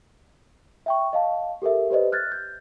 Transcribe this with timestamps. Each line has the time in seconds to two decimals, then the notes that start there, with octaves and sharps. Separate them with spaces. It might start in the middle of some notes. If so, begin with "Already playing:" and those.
0.86 E5 G5 C#6
1.13 D#5 F5 A5
1.62 G4 A4 A#4 E5
1.90 G4 B4 C5 D5 D#5
2.12 F6 F#6 G#6 A6
2.32 G6